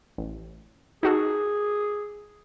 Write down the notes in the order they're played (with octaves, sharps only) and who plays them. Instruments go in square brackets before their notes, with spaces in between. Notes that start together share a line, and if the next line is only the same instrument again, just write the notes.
[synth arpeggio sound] A1
[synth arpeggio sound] D#4 F#4 A4 [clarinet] G#4